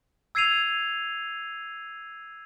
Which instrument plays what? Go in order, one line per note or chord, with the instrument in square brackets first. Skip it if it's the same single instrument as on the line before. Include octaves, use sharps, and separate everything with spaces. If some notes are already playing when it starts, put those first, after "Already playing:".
[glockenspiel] E6 G#6 C7 D#7 F7